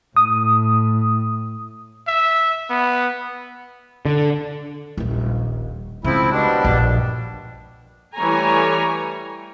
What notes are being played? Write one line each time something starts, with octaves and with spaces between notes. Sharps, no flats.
A2 D#6
E5
B3
D3
D#1 A#1
C#3 F3 G#3 C4 E4
B2 G3 D4
A#1 G2
E3 G3 A3 C#5 G#5 A#5